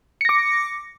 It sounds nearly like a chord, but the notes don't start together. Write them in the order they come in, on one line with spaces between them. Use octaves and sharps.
C#7 A#6 D6